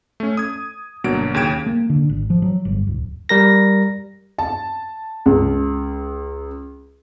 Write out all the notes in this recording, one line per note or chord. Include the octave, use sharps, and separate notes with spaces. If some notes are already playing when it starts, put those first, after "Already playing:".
A3 C#4
D#6 G#6
G1 B2 F#3 A#3 D4 D7
D#2 C#3 G5 G#6 D7 E7
A#3
D3
G#1
F3
F#3
G1
D1
G3 A#4 A#6
A5
C#2